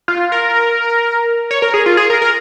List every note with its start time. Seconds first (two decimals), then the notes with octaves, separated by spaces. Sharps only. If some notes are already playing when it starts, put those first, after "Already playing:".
0.08 F4
0.32 A#4
1.51 C#5
1.62 A#4
1.74 G#4
1.86 F4
1.97 G#4
2.10 A#4
2.22 A#4